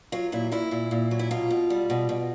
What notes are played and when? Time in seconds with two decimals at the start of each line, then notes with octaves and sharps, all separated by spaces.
0.12 F#3 F4
0.32 A#2 E4
0.52 A#2 E4
0.71 A#2
0.91 A#2
1.11 F#3
1.19 E4
1.31 B2 F4
1.50 B2
1.70 G3
1.90 B2
2.09 B2